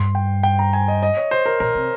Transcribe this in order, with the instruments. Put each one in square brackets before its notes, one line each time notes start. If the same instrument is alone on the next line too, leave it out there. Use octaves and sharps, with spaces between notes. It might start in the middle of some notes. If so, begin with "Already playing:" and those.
Already playing: [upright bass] G2 [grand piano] C6
[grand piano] G5
G5
A#5
G#5
D#5
D#5
C#5
C5
A#4
[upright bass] A#2 [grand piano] A#4
[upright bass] C3